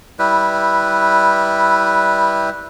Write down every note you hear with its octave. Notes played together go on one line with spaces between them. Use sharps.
G3 E4 B4